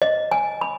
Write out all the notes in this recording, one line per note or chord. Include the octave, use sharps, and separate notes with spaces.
D#5
G#5
B5